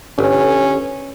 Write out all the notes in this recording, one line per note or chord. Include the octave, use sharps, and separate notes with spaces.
G1 C#4